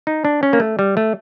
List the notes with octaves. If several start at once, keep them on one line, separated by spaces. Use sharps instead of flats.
D#4
D4
C#4
A#3
A3
G3
A3